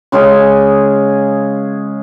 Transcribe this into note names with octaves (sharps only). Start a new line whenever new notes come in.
C#3 G#3 C#4 G#4